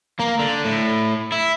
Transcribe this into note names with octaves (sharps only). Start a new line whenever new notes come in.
A#3
D3
A2
E4